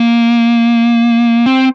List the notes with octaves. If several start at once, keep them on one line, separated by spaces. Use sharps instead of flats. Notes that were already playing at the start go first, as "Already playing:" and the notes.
Already playing: A#3
C4